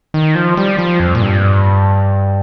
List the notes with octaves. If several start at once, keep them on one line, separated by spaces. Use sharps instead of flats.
D#3
F3
G3
F3
F2
A#2
G2